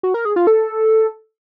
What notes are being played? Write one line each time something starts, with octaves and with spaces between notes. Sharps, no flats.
F#4
A#4
G#4
F4
A4